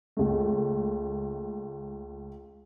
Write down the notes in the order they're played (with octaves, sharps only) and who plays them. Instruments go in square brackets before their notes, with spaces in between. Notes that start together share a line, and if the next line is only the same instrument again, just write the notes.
[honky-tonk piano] C#2 A3